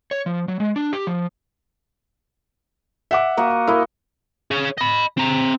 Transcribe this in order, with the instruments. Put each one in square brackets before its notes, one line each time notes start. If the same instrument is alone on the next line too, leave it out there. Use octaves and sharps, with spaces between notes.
[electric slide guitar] C#5
F3
F#3
G#3
D4
G4
F3
[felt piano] E5 F#5 D6
[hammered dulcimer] A#3 F#4 D#5
[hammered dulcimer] E4 D#5 [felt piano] A#4
[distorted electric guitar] G#4 C#5
D#5 B5
C4 A#5